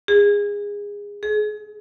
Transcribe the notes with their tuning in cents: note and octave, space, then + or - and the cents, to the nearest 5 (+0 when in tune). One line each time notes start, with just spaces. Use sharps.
G#4 -20
G#4 +35